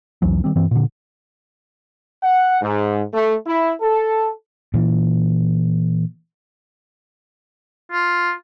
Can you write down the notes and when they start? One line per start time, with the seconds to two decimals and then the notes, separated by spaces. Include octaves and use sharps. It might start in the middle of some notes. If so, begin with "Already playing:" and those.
0.22 C2 F2 E3 F#3
0.44 D#3 G3 C4
0.56 G2 E3 C4
0.71 A#2 D3
2.23 F#5
2.62 G#2
3.13 A3
3.47 E4
3.81 A4
4.74 A#2 E3
7.92 F4